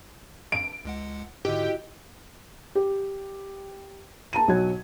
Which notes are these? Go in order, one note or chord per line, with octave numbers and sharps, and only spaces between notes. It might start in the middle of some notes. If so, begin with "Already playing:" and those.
D7
C#2 G#3 F#5
G#2 D3 E4 F#4 G4 D#5
G4
A#3 A5 A#5 D#7
B1 F#3 F#4 C#5 F#5 G#6